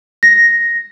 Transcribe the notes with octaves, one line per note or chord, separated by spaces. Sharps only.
A#6